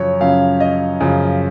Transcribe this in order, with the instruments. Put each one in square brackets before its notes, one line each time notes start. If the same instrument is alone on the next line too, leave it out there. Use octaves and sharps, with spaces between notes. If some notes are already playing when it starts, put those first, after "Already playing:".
Already playing: [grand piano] F#2 C#3 F3 C#5
F#2 C#3 F3 F5
D#5
F#2 C#3 F3